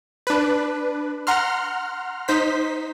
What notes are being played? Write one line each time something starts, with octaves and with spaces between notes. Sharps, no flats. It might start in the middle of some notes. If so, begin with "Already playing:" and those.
D4 B4
F#5 A#5 C6 F6
D#4 C5 B6